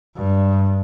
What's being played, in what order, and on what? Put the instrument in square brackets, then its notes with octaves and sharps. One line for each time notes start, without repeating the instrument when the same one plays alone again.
[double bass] G2